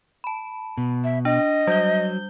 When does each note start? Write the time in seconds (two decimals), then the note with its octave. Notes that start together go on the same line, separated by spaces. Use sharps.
0.24 A5 B5
0.77 B2
1.04 E5
1.25 D4 D#5
1.67 F#3 G3 G6 G7